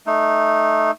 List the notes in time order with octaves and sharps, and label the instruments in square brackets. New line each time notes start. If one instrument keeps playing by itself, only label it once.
[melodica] A3 D#4